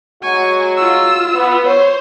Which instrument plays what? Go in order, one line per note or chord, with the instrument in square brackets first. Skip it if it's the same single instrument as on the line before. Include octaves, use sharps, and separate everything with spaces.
[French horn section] F#3 G#3 F#4 [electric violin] G#5 C#6
[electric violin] F4 E6
[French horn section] B3
[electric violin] C5 [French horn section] C#5